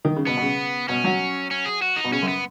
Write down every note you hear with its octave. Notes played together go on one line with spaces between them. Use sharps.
D#3
C#3
B2 B3
B2
C#3
B2 C#4
F#3
C#4
G#4
F#4
D#4
B2
C#3 C#4
F#2
B3